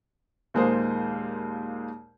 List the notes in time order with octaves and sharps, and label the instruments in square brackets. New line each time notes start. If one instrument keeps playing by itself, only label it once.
[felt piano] D#2 A#2 G#3 A#3 G#4 C5